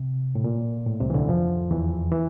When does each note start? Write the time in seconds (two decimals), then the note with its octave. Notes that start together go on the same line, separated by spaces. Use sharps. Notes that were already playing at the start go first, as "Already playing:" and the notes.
Already playing: C3
0.35 A2
0.44 A#2
0.86 A2
1.00 C2 C3
1.10 E3
1.14 D2 D3
1.28 F2 F3
1.71 E2 E3
2.12 E3